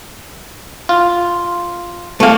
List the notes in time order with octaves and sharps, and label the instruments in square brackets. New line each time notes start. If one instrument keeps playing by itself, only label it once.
[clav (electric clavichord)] F4
[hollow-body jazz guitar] A3 F5